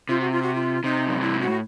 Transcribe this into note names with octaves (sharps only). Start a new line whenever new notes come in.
C3 F4
F#4
F4
F#4
F4
C3 D#4
F#2
G2 E4
G#2
F#4
A2